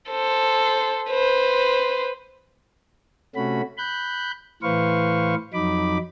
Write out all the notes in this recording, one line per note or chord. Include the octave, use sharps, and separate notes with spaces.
A4 C5
B4 C5
C3 A3 C#4 F#4 B5
B5 F#6 G6
A2 E3 B4 C5 F5 C#6
F2 F#3 D#4 B5 D6